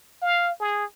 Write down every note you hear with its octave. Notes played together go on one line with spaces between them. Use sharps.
F5
G#4